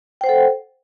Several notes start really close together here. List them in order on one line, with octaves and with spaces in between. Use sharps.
G5 C5 F#5 A4